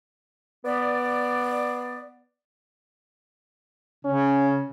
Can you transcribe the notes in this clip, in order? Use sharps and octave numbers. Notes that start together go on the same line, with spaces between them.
B3 D5
C#3 C#4